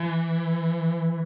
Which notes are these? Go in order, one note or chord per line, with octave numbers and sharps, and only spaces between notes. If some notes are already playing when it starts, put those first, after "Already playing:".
Already playing: E3